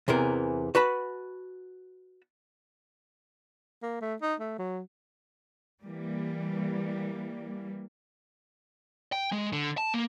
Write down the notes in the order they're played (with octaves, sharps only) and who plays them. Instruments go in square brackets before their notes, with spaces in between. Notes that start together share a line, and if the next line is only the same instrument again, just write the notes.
[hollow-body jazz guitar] E2 C3 E3 A#4
F#4 B4 A5 B5
[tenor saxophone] A#3
A3
D#4
A3
F#3
[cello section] E3 G3 A#3
[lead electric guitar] G5
G#3
D3
A5
A#3